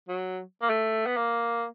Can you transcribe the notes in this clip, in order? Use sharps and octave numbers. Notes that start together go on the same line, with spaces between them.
F#3
A#3
A3
B3
A#3